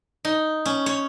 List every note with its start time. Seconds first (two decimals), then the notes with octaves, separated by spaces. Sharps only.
0.25 D#4
0.66 C#4
0.86 C#5